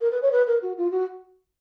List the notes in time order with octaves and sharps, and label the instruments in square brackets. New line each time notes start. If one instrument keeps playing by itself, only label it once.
[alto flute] A#4
B4
C#5
B4
A#4
F#4
F4
F#4